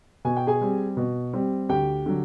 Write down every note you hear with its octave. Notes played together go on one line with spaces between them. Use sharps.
B2 G#5
G5
G#4 G#5
G3 C4
B2
G3 C4
D2 G4 G5
D3 F#3